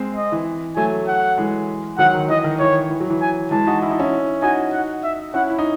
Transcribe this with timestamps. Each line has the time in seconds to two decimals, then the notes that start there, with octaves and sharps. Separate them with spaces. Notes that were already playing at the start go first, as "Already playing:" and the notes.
Already playing: G#3 C4
0.16 D#5
0.32 E3
0.77 F#3 A3 G#5
1.08 F#5
1.38 E3 G#3
1.98 D#3 F#3 F#5
2.14 D#3
2.30 E3 D#5
2.44 D#3
2.60 E3 C#5
2.90 E3
3.01 F#3
3.10 E3
3.22 G#5
3.51 E3 G#3 A5
3.67 D#4 F#4
3.82 E4
3.91 D#4
3.99 C#4 E4
4.42 D#4 F#4 G#5
4.73 F#5
5.04 E5
5.34 C#4 E4 F#5
5.50 E4
5.59 D#4